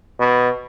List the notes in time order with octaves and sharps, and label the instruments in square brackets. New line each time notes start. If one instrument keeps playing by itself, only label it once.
[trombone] B2